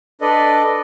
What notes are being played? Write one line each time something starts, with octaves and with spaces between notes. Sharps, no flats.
D4 A4 B4 D5 D#5